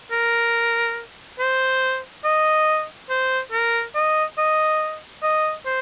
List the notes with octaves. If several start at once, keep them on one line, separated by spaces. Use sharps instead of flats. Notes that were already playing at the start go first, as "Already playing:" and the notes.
A#4
C5
D#5
C5
A#4
D#5
D#5
D#5
C5